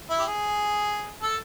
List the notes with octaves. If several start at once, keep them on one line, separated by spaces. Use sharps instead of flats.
E4
G4
G#4
A4